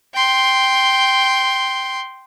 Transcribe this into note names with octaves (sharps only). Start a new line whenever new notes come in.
G5 C6